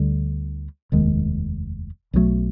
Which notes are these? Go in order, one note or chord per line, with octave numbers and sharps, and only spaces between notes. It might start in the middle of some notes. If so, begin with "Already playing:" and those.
Already playing: D2 D3 G3
F1 D#2 D#3 G#3
B1 A#2 F#3 A3